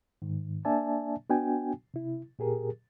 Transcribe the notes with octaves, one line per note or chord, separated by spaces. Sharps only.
G#2 D#3
A#3 D4 D5 E5 G#5 A5
B3 D4 F#4 G5 G#5
C3 E4
A#2 G4 G#4 A#4